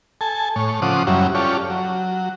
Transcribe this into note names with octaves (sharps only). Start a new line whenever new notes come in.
A4 G#5 A5
A2 C#5
C#3 F3 C5 F#5 D6 D#6
F#2 F#3 G3 C#4 E4
C#4 F4 G4 A4 C#5 D5
F#3